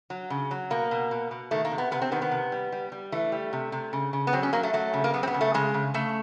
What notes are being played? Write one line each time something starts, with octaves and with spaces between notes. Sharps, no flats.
F#3
C#3
F#3
B2 A#3
B2
B2
B2
D#3 A3
A#3
C3
B3
C3 B3
C4
D#3 B3
B3
C3
G3
G3
G3
E3 A3
G3
C3
C3
C#3
C#3
B3
F#3 C4
C#4
F#3 A#3
A3
F#3 A3
C#3
A#3
F#3 B3
C4
B3
C#3
A3
C#3 G#3
C#3
C#3 A3